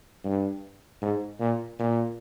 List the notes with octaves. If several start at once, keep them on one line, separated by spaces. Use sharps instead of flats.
G2
G#2
A#2
A#2